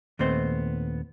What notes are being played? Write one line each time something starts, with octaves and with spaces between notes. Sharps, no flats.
D#2 A#2 A3 B3 C4 C5